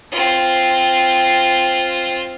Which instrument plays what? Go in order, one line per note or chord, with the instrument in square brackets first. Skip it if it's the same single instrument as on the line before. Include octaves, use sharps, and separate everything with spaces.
[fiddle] C4 F4